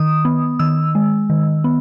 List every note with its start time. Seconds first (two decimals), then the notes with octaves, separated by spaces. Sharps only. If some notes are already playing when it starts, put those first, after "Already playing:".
Already playing: D#3 D#6
0.25 B3
0.59 D#3 E6
0.95 G#3
1.30 D#3
1.64 B3